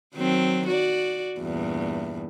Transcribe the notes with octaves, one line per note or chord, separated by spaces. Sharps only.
D#3 F#3 C4
F#4 D5
E2 G2 A#2